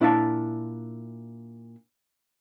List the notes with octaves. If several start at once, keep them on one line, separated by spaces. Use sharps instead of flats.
A#2 D4 E4 E5 F5 A5